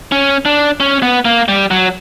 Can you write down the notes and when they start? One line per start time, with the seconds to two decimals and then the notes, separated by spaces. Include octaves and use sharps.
0.12 C#4
0.45 D4
0.80 C#4
1.02 B3
1.25 A#3
1.48 G3
1.71 F#3